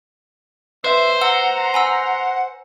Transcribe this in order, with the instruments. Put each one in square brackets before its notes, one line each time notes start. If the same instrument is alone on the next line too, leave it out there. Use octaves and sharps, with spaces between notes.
[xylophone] B4 [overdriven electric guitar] C5 [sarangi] E5
[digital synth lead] F#5 [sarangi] A#5 [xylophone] E6 G7
[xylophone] G#5 B5 E6